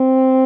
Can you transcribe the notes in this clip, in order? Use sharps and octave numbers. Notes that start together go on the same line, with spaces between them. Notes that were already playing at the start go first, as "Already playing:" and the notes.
Already playing: C4